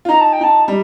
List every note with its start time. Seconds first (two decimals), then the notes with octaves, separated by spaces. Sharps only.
0.05 F4
0.09 D#4 A#5
0.20 A5
0.33 G5
0.41 D#4 A5
0.68 G3